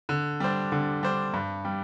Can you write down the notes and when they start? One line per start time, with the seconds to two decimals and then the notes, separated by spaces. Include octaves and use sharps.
0.09 D3
0.40 G3 D4 C5
0.72 D3
1.03 G3 D4 C5
1.34 G2
1.65 G3